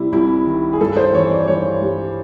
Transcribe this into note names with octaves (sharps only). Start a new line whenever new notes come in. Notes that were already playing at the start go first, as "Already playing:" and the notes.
Already playing: C3 G3 E4
C2 E4
D#3
G#4
G2 A4
C5
E3 C#5
D5
G2 C#5
G3